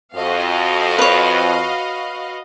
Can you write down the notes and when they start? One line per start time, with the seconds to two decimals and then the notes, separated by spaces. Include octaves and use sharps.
0.16 F2 F#4 D#5 F5
0.99 B4 C#5